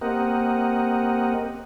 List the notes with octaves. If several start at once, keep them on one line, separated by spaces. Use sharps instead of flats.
A#3 C4 G4 A#4 D#5 F#5